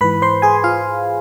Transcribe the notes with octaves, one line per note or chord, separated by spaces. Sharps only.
G#2 E3 B4 B5
C5 C6
G#4 G#5
F4 F5